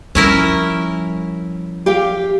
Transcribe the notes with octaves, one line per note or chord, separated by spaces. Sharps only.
F3 G3 C#4 E4 A#4
G4 F5 G5